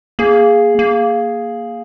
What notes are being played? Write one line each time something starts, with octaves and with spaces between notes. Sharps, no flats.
A#3 G#4
A#3